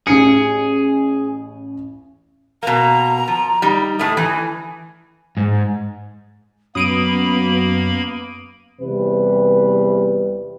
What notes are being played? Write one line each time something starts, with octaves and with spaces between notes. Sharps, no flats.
A1 G#4 G#5 C#7
B2 A#3 A#5
F3
G3 D#4
A2 A3 D#6
E3 G#5
G#2
F#2 A#3 B3 B5 D#6 D7 D#7
E2 C3 G3 B4